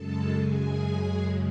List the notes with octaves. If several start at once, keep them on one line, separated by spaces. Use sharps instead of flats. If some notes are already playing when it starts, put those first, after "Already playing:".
Already playing: F#2 C#3 G#3 A4 A5
G#4 G#5